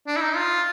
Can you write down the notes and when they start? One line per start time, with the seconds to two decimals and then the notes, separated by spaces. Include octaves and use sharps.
0.07 D4
0.16 E4
0.21 D#4
0.36 F4